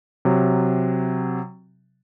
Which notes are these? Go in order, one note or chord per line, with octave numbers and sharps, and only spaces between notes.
C3 F#3